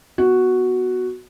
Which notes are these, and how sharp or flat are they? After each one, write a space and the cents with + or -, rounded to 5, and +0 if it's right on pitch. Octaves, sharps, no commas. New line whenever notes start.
B3 +0 F#4 +0